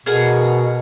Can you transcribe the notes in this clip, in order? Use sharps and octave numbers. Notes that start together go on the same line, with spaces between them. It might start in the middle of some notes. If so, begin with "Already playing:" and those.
B2 G#4 A#4 F#5